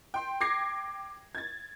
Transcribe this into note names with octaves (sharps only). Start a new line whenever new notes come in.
G5 C6
G5 D6 G#6 A#6 C7
G#6 A6